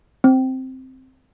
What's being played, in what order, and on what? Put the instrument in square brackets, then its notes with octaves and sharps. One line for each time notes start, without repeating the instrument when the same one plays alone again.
[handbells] C4